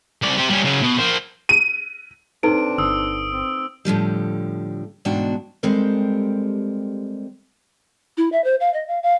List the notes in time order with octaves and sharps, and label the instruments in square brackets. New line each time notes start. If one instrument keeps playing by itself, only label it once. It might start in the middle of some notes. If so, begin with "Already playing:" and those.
[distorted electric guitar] C2 D5
C4 G4
G3 C#4
C#3 F#3
B2
A#3 C5
[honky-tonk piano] D#7
[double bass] C4 D4 [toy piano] D#4 A4 B4 [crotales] D7
[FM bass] G1 [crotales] D#6 E6
[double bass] C4
[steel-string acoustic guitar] A2 D3 F3 G3
E2 G#2 B2 D4 F#4 G5
G3 G#3 C4 G4 A4 A#4
[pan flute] E4
E5
C5
F5
D#5
F5
F5